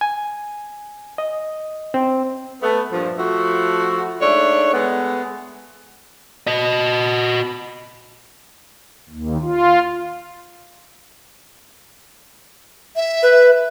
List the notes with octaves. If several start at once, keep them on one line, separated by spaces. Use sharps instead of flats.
G#5
D#5
C4
A3 B3
G2 A#2 F3
F3 A3 E4 F#4
G#2 A3 D4 C#5
G#3 A3 B3
F#4 D#5
D#2
F4
E5
B4